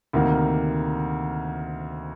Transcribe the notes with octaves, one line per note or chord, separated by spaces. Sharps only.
D2 C3 D#3 A#3